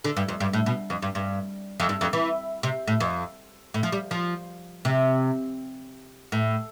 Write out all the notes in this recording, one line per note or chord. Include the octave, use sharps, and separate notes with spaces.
D3
G2
F2
G2
A2
B2
F2
G2
G2
F2
G2
F2
E3
C3
A2
F2
A2
F3
G3
F3
C3
A2